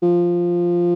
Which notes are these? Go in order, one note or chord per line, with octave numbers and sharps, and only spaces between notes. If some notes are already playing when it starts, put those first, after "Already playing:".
F3